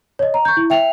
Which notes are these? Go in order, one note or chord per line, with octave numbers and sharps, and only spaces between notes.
C#5 D#5
A#5
C#6 G6
E4
E5 G5 F7